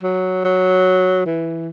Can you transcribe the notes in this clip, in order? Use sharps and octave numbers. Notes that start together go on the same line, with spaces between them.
F#3
F#3
E3